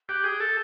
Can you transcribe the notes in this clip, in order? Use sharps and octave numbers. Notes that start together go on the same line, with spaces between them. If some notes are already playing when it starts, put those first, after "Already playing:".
G4 F#6
G#4 G6
A4